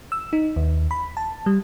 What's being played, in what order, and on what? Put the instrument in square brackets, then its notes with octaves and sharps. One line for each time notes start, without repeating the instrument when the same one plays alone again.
[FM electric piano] E6
D#4
D#2
B5
A5
G3